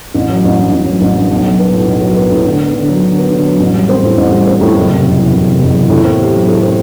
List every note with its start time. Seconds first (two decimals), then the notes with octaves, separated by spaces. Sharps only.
0.14 A1
0.30 F#3
0.44 A1
0.58 G2
0.72 A1
0.86 F#3
1.01 A1
1.16 G2
1.31 B1
1.45 F#3
1.59 B3
1.73 A2
1.88 B1
2.01 F#3
2.16 B3
2.31 A2
2.46 D3
2.60 B3
2.74 D3
2.89 F#3
3.03 D3
3.18 B3
3.31 D3
3.46 F#3
3.60 A1
3.74 G3
3.89 C4
4.03 A2
4.17 A1
4.32 G3
4.47 C4
4.61 A2
4.75 F#1
4.90 C3
5.04 F#1
5.18 E2
5.33 F#1
5.48 C3
5.61 F#1
5.75 E2
5.90 A2
6.05 C4
6.19 G4
6.34 F#3
6.47 A2
6.63 C4